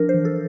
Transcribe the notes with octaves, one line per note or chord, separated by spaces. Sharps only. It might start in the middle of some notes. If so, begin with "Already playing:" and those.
Already playing: F3 D4 A#4
C5
E3
A4